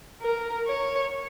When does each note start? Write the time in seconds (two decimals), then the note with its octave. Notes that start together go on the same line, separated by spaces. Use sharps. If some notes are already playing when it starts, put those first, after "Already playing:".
0.22 A#4
0.67 C#5